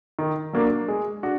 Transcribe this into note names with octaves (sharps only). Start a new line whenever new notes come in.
D#3
F#3 A#3 D4
G#3
D4 F#4